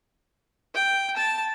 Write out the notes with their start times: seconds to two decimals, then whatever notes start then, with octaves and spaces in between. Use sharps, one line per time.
0.75 G5
1.17 A5